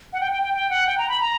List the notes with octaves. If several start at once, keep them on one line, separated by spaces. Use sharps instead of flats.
F#5
G5
G5
G5
G5
F#5
G5
A#5
B5
A#5